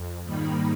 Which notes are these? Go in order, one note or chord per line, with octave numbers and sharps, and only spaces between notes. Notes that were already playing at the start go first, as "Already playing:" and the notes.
Already playing: F2
G#2 D#3 G3 A#3 D#4 B5